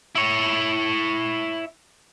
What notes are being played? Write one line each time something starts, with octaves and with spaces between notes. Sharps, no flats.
E4 C#5